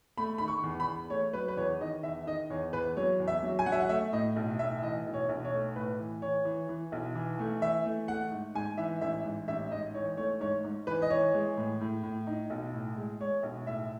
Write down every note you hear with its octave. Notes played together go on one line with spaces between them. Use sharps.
A3 B5
D#3 B5
C#6
E2
B5
E2
A3 C#5
F#3 B4
B4
E2 C#5
D#3 D#5
E2 E5
D#3 D#5
E2 C#5
E2 B4
F#3 C#5
E2
E5
F#3
G#5
F#3 F#5
E5
F#5
A3 E5
A2 D#5
B1
A2 E5
E3 D#5
B1
C#5
B1
C#5
A3
A2 B4
E3
E3 C#5
E3
E3
B1
E3
A3
E3 E5
A3
A3 F#5
G#2
G#2 G#5
E3 E5
A1 E5
G#2
A1 E5
G#2 D#5
E3 C#5
A3 C#5
G#2 C#5
G#2
E3 B4
D#5
E3 C#5
G#3
A2
A2
A2
D#4
B1
A2
G#3
G#3 C#5
B1
A2 E5